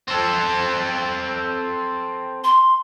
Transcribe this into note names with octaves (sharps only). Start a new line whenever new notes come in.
C4 A4
C6